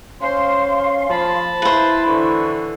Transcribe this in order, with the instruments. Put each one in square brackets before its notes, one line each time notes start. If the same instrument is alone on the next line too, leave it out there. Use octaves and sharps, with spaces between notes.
[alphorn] C#4 [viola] C5 [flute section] F5 C6
[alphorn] F3 [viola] A5 B5
[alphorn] E4 [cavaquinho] B4 C5 [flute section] F5
[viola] D3 E3 [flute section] C#6